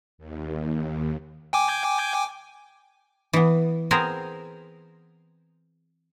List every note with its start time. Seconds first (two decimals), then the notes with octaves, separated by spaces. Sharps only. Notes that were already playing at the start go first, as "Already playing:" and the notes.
0.18 D#2
1.53 G5 G#5 D6
3.33 E3 B3
3.91 B3 C4 G#4 A#4 C5